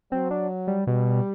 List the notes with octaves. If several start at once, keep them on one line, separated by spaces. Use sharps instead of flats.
F#3 C4
D4
G3
B2 G3